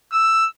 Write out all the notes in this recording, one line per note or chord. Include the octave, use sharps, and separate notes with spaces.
E6